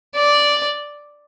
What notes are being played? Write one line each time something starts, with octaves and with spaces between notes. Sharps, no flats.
D5